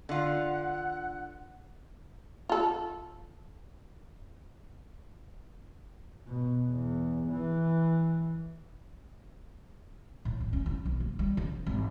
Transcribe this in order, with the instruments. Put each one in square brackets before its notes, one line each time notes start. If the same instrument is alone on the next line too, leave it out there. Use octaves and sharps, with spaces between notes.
[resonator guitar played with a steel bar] D3 F4 [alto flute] F#5
[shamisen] F4 A4
[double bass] B2
E2
E3
[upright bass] A2
D#2
C#4
E4
B1
A#3
G3
C#3
D#3
G#1